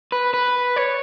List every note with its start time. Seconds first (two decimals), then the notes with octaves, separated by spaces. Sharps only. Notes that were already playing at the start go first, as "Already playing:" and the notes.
0.12 B4
0.34 B4
0.76 C#5